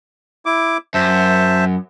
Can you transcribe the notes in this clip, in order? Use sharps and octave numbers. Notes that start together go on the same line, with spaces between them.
E4 D6
F#2 C5 E5 A5